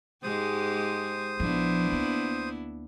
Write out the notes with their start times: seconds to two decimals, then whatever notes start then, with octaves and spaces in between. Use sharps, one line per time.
0.23 G#2 G#3 G4 C5 D#6
1.40 A#1 F3 B3 D4 E4
1.92 D2 A#3